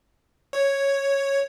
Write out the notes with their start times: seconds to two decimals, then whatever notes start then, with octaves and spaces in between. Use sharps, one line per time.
0.53 C#5